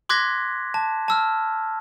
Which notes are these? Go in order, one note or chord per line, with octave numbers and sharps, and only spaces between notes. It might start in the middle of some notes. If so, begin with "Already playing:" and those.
C6 D6 F#6 G#6 A#6 B6
A5
A5 E6 F6